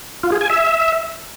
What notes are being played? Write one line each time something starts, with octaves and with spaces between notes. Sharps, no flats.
F4
G#4
G#5
E5